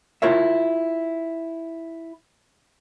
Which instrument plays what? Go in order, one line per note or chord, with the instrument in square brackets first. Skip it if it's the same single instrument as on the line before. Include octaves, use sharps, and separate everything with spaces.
[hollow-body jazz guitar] E4 F4 A#4 C#5 E5